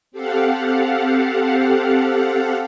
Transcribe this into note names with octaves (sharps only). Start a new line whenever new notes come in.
C4 G4 A4 F5 F#5